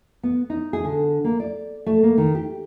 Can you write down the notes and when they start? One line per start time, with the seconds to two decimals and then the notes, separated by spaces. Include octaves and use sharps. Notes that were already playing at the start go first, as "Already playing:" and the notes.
0.23 B3
0.50 D#4
0.73 G#4
0.85 D3
1.24 A#3
1.40 D5
1.86 A3
2.03 A#3
2.18 D#3
2.35 G4